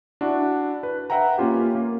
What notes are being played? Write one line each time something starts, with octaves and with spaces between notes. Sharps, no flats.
D4 E4 F#4
B4
B4 E5 F#5 G5 A#5
A#3 C#4 F4 G4
A#3